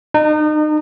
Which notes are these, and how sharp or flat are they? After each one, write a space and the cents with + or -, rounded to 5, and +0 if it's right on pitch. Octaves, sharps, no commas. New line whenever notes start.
D#4 -35